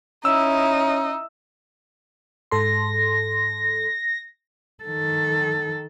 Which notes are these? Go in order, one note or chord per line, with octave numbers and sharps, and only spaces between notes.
C#4 D#4 E4 E6
G#2 A4 C6 A#6
D#3 A4